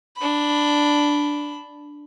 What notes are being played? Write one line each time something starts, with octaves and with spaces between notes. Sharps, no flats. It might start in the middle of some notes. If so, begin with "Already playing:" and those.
D4 B5